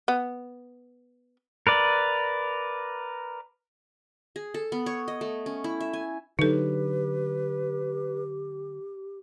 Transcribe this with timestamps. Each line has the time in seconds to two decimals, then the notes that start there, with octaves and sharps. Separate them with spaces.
0.08 B3
1.67 A#4 B4 D5
4.36 G#4
4.54 A4
4.72 B3
4.86 C#5
5.08 D#5
5.21 A3
5.46 C#4
5.64 E4
5.81 E5
5.93 G#5
6.39 D3 F#3 D#4 G4 A4 B4